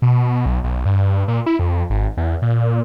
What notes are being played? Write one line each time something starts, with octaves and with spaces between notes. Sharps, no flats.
B2
B1
B1
G2
A#2
E4
F2
G#1
E2
A#2